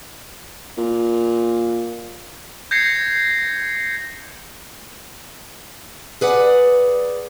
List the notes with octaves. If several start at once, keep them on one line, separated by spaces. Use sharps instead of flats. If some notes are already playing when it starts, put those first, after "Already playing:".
A#2
G6 G#6 A#6 C7 C#7
G#4 B4 D5 F#5